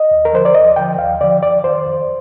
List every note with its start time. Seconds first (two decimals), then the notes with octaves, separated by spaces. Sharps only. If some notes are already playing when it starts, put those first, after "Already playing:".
Already playing: D#5
0.11 D#2
0.25 A#4
0.33 D3 F3 C5
0.45 D5
0.55 D#2 D#5
0.76 D3 F3 G5
0.99 D#2 F5
1.20 D3 F3 D5
1.43 F2 D5
1.64 D#3 C5
1.86 F2